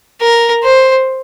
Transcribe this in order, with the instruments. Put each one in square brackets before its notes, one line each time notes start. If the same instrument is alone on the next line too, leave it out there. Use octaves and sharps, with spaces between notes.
[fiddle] A#4
C5